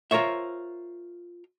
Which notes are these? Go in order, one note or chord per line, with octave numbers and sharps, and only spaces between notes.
F4 A#4 C5 C#5 E5